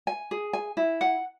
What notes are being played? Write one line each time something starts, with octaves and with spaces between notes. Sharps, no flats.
G#5
G#4
G#5
E4
F#5